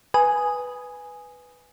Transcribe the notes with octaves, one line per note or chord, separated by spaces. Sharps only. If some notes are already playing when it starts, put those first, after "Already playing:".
B4 G#5 D#6